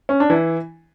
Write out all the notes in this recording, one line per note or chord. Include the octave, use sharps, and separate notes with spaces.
C#4
D4
E3 E4